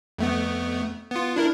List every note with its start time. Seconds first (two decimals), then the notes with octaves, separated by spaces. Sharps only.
0.18 F2 A3 B3
1.11 B3 F4
1.36 D4 E4 A#4